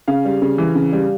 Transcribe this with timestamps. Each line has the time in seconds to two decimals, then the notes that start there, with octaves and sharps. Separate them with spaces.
0.08 C#3 F5
0.25 G3
0.42 C#3
0.58 E3
0.75 C#3
0.92 G3